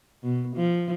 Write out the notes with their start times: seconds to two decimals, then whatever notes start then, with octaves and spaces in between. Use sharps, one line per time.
0.23 B2
0.56 F3